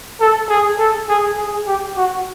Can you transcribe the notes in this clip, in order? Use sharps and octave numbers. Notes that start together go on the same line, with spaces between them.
A4
G#4
A4
G#4
G#4
G4
F#4